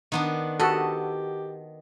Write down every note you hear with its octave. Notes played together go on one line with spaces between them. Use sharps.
D#3 B3 D4
F#4 G4 A4 D#5 B5